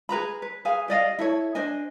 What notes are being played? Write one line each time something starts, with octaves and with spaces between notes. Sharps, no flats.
G#4 B4 A#5 B5
B4
G#4 B4 F5 G#5
G4 D5 D#5 F5
E4 A4 C#5
D4 C5 D#5 G#5